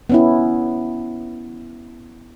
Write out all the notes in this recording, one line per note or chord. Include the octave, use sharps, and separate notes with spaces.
B3 C#4 E4